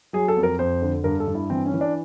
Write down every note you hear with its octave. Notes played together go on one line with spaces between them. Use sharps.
F#3 G#4
A4
F2
A#4
F2 C5
D3
G2 A#4
A4
G2
E4
E3 C4
C#4
E3
D4